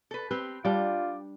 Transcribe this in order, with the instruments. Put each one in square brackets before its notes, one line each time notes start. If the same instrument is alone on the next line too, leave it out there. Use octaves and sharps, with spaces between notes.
[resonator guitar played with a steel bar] A4 B4
[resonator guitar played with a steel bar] C4 G4 [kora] B4
[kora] G3 D4 [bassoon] F4 [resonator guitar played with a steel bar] D5 G5